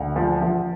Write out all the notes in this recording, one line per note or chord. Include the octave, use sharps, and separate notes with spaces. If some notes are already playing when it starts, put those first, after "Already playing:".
Already playing: D2
F3
F3